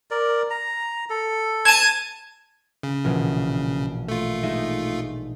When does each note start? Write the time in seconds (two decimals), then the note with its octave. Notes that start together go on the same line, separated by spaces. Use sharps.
0.11 A#4 D5
0.50 A#5
1.10 A4
1.65 A5 G#6 D#7
2.83 C#3
3.04 A#1 B2 E3
4.09 A3 F4
4.43 G#3 D#4 E5